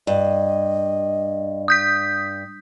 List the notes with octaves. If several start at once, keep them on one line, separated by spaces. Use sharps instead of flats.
G2 D#5
D#6 G6 B6